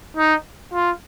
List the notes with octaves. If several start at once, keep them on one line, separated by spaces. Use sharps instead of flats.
D#4
F4